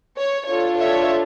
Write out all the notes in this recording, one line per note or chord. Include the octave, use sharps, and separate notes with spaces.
C#5
D4 F4 A4 C#5
C#5 E5